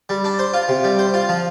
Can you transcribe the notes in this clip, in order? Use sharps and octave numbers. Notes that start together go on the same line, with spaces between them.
G3
D4
C5
F4
C3
G3
C5
F4
F3